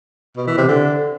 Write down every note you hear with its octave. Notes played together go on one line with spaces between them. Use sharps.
B2
E3
C3
D3